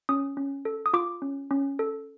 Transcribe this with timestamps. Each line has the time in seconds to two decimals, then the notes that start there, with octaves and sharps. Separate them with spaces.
0.09 C#4 D#6
0.37 C#4
0.65 A4
0.86 D#6
0.93 F4 D6
1.22 C#4
1.51 C#4
1.79 A4